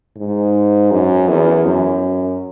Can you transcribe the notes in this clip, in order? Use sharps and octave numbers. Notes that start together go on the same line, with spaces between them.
G#2
F#2
E2
F#2